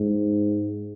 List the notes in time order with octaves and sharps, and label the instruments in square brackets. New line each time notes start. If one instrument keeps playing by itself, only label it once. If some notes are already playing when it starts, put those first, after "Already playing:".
Already playing: [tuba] G#2